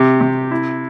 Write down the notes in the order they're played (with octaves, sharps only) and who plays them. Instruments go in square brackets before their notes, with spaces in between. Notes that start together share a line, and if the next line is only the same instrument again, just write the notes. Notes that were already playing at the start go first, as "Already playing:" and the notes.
Already playing: [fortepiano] C3 G4
C3
E4